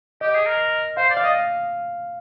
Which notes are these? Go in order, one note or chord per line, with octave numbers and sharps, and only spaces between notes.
G4 D#5
G#4
A#4
C5 F5
D5
F5
D#5